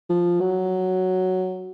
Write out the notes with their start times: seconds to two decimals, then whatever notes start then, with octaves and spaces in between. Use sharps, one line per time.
0.10 F3
0.40 F#3